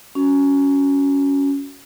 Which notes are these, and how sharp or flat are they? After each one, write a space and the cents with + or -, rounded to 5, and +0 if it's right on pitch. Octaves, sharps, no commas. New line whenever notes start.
C#4 +10 F#4 +0